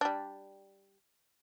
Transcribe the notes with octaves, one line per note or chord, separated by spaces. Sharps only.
G3 D4